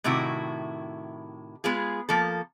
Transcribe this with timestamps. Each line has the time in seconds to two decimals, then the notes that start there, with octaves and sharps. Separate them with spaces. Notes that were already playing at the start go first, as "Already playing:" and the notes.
0.04 A2 C3 D#3 E4 F#4
1.64 G#3 B3 F4 G#4
2.09 F3 A#3 A4